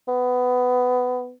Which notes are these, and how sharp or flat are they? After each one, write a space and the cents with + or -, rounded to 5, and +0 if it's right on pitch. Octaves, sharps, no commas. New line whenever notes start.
B3 +15